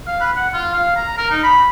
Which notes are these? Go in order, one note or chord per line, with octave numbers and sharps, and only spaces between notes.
F5
B4
F#5
F4
F5
A#5
A#4
D#4
B5